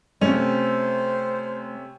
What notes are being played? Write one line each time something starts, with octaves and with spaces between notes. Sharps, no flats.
C3 A3 C#4 C5